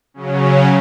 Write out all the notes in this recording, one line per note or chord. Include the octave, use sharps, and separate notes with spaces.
C#3 F#3 C#4